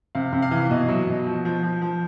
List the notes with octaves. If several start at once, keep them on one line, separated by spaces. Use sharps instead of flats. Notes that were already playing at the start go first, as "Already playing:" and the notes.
C3 F5
C3
F5
E3
B2 D#5
F#3
B2
F3
F3
F3
F3